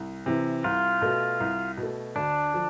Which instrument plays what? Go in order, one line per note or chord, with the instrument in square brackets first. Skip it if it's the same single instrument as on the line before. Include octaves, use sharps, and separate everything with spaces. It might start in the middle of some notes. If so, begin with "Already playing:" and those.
Already playing: [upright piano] C2
C3 E3
[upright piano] C2 [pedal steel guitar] F4
[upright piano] B2 A3
C2
B2
A3
[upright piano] D2 [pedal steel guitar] D4
[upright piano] D3 F3